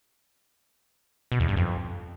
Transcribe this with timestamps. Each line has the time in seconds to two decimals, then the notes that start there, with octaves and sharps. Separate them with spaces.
1.32 B2
1.40 E2
1.48 G2
1.56 F2